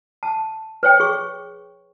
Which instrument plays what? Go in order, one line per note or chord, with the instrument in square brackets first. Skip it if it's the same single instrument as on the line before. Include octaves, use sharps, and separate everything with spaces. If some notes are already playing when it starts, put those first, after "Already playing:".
[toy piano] A5
B4 C#5 G5
G#4 C#6